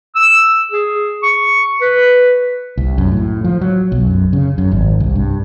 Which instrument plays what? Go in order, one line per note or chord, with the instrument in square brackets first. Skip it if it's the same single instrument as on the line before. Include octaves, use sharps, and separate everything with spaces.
[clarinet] E6
G#4
C#6
B4
[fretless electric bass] C2
F#2
A2
F3
F#3
B1
F#2
C#3
F#2
G#1
C2
G2